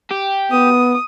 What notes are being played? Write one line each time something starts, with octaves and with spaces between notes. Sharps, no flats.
G4
B3 D#6